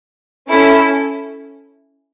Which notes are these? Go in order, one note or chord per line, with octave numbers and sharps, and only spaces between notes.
C#4 E4 A4